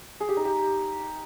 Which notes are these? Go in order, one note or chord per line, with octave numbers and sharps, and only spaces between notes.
G#4
G4
D#4
G4